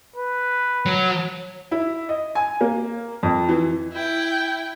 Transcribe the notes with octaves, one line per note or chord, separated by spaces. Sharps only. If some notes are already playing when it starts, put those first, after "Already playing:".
B4
F#3
E4
D#5
G#5
A#3
F2
E3
E4 G5